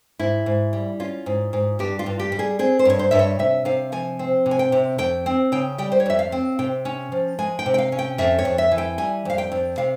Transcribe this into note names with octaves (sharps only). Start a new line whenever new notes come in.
G#2 E4
G#2
G3
C#4 F4
G#2
G#2
G2 G4
F4
G2
G4
G3
G#4
C4 G#4
C5
G2 C#5
C5
G2 E5
C#5
C3 E5
C3 F5
F3 G#5
C4
C3
G#5
G5
C3
F2 G5
C4
C#3 G5
G3 G5
C5
C#5
F2 E5
F5
C4
C3 G5
C#4
F3
G#3 G#5
G5
C3
G5
F5
C#4
G5
F2 E5
C#5
F2
E5
E3
G5
G3 G#5
F2 F5
G5
F2
C3 F5